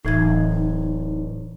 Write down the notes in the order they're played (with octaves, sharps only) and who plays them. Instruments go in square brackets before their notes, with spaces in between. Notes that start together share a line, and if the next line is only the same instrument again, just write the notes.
[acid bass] D1 [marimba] A2 E3 G#6 [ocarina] D#4